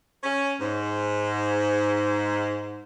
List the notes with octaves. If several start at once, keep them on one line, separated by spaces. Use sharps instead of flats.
C#4
G#2